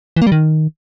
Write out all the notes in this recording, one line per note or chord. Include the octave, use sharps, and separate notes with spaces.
E3
A#3
G3
D#3